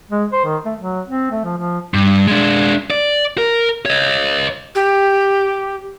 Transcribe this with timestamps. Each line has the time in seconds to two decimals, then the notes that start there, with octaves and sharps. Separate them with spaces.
0.10 G#3
0.32 C5
0.45 D#3
0.65 A3
0.79 F#3
1.08 C4
1.31 A3
1.44 F3
1.58 F3
1.94 G2
2.27 G#3 D4
2.90 D5
3.38 A#4
3.86 C#5 D#5
4.75 G4